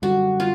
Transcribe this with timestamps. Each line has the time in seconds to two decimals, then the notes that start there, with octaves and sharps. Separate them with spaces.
0.02 F#2 D3 G3 F#4
0.40 F4